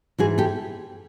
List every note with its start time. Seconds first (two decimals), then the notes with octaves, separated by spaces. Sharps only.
0.18 G#2 E3 F#4 G#4
0.38 G4 A4